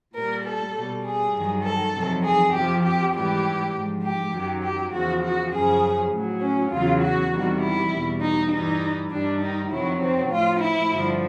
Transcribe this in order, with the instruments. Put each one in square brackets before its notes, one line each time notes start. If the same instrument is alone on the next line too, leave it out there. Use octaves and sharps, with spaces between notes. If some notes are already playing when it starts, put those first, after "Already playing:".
[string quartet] A#2 G3 A#4
A4
B2 G3
G#4
G2 D#3 F#3
A4
F2 C3 D#3 F#3
G#4
F2 C3 F3 G4
G4
G#2 E3 G3 G4
G#2 F3
G4
F#2 D#3 F#3
G4
E2 C#3 F3 F#4
F#4
F#2 C#3 F3 G#4
A2 F#3
C#4
E2 C#3 F#3 F4
F#4
E2 C3 D#3 G3
E4
E2 B2 G3
D#4
G2 E3 G3 D#4
G2 D#3 G3 D4
D#4
F2 C3 D#3 F#3 E4
C4
A2 F3 F4
E4
G2 D3 F3